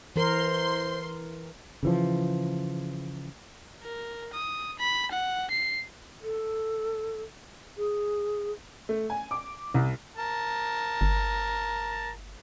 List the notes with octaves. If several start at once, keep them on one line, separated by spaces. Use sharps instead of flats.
E3 A#4 C5 C6
C#3 E3 F3
A#4
D#6
B5
F#5
C7
A4
G#4
A3
G#5
D6
C2
A#4 A5
G1